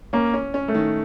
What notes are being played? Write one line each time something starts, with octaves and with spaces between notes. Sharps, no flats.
A#3 C#4
C#4
C#4
A3
D#3